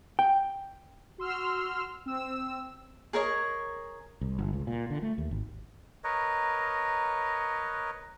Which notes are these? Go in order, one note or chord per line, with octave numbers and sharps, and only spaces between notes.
G5
F#4 C6 E6 F6
C4 E6
G#4 A#4 C#5 D#5
C2
G1
C#2
A#2
D3
A3
D#2
G#1
A#4 B4 C#5 D#5